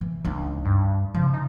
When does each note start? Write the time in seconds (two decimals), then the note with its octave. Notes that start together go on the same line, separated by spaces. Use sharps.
0.01 E3
0.25 C#2 D4 D#4
0.65 G2
1.14 C#3 F3
1.34 D#4